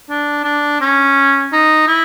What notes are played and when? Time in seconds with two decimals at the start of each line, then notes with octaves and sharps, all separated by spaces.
0.09 D4
0.44 D4
0.81 C#4
1.52 D#4
1.88 E4